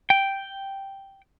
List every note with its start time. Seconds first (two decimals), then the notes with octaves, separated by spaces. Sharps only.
0.10 G5